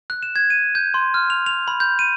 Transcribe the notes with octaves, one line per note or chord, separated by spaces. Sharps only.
F#6
E7
G#6
D#7
G6
C6
F6
F7
F7
B5
G6
D#7